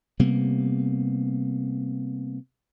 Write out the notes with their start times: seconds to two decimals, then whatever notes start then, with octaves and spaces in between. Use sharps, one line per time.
0.20 C3 G3 A#3 B3